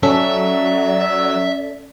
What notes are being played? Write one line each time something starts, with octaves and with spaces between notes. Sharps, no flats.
F#3 C#4 A4 D5 E5